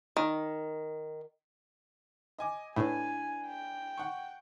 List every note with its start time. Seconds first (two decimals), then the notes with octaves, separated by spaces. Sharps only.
0.17 D#3
2.39 D#5 G#5 D6
2.76 A2 D4 E4 B4 G#5
3.47 G5
3.97 F#5 C#6